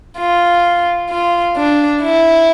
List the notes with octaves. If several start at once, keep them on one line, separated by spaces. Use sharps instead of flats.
F4
F4
D4
E4